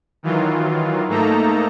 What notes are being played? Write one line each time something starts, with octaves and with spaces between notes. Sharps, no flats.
D#3 E3 F#3 F4
G#2 A3 A#3 D#4 A4 A#5